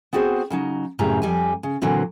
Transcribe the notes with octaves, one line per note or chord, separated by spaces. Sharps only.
B3 C4 F#4 G#4 C5
C#3 F#3 D#4
F#2 A2 C#3 G3 C4 A#5
F2 G3 G4 G#5
C#3
A#2 D3 E3 F#3 C4